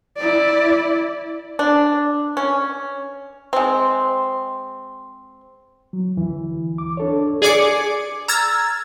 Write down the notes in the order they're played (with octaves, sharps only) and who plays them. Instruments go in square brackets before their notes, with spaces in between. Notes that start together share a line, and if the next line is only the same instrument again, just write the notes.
[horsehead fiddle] E4 D5
[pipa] D4
C#4
G#3 C4
[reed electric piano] F#3
D2 E3
D6
D4 A4 C#5
[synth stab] G#4 D5 G#5 D6 C#7
A#5 E6 F6 G#6 A6